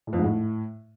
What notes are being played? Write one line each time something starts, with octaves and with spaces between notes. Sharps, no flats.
A2
F2
G#2
A2